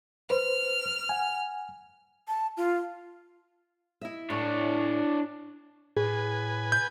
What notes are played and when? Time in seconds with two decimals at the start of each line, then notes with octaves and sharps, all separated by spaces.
0.30 B4 C5 F6
1.09 F#5 G#5
2.28 A5
2.57 F4
4.01 E4 D#5 E5
4.30 A2 D4 C#5
5.97 A2 G#4 B4 G#5
6.72 G6